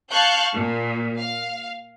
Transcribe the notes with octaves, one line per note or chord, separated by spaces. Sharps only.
F5 A5 C#6 F#6 G6
A#2
F5